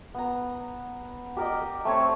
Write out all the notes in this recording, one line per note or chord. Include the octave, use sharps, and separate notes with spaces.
B3 A#5
G4 A#4 D5 D#5
A3 C4 C#5